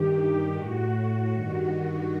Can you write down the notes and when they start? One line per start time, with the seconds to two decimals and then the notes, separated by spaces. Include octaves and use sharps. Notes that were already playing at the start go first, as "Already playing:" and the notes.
Already playing: G2 D#3 G4
0.18 G4
0.55 A2 F#4
1.32 G2 D#3